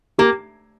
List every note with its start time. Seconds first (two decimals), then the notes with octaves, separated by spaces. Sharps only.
0.19 A#3 G4